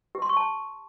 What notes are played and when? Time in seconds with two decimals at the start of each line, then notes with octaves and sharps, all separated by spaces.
0.15 G4
0.22 C6
0.29 C#6
0.37 A5